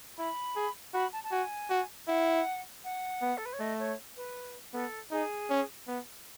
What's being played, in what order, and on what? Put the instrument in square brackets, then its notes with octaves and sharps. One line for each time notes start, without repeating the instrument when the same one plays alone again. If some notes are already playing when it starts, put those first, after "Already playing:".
[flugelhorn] E4 [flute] B5
[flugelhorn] G#4
[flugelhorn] F#4 [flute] B5
[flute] A5
A5
[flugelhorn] F#4 [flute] G#5
[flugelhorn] F#4
[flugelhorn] E4 [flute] F#5
[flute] F#5
[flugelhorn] B3
[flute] A4
B4
C#5
[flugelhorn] A3 [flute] D#5
[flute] C#5
B4
[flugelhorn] B3 [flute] A4
[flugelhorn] D#4 [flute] G#4
[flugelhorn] C#4
B3